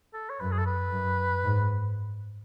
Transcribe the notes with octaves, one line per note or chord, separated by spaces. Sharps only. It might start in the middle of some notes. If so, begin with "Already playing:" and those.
A4
C#5
F#2 B4
G#4
A4
B4
F#2
G#2